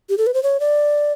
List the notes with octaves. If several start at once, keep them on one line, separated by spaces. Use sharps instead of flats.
G4
A4
B4
C5
C#5
D5